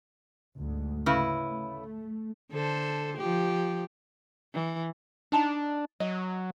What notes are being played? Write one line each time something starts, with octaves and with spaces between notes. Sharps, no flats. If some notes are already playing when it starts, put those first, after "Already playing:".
D2 G#2
C#3 E4 B4
A3
D3 A4 C5
F3 G4
E3
D4 D#4 A5 A#5
F#3 D#5